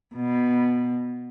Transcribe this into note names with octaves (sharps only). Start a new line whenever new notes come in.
B2